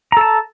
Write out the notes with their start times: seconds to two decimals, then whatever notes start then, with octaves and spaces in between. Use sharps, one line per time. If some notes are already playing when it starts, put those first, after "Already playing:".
0.12 A#5
0.17 A4
0.21 A5